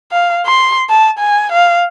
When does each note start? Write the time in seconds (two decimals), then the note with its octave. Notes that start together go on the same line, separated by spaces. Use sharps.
0.12 F5
0.46 C6
0.90 A5
1.19 G#5
1.52 F5